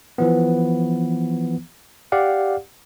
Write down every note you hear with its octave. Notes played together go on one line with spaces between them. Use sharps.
E3 F3 B3
G4 D5 F5 F#5